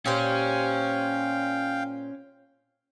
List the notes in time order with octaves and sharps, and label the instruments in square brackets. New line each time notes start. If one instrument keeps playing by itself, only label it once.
[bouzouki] A#2 G4 C5 [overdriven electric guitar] C#4 [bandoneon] F5 G5